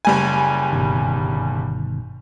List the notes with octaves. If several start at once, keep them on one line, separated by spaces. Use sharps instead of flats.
F#1 G3 G#5
G1 B2 D#3